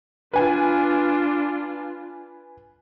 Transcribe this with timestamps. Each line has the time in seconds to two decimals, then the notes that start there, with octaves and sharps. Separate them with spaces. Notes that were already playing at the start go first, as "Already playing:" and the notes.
0.33 D4 F4 B4 G#5